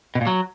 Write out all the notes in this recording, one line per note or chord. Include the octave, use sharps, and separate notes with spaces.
B2
A#2
F#3